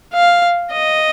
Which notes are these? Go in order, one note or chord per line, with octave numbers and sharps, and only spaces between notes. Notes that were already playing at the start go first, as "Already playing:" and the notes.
F5
D#5